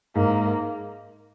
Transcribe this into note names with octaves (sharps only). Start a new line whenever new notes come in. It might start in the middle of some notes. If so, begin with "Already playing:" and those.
G#2 A#3